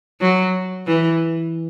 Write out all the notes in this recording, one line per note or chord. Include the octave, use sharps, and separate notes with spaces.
F#3
E3